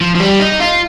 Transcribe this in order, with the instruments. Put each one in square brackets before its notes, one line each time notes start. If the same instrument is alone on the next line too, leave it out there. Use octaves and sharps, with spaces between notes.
[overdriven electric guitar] F3
F3
G3
D#4
F4